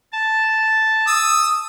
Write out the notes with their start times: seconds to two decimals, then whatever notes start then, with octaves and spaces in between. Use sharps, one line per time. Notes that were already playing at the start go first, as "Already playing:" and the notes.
0.12 A5
1.07 D#6 E6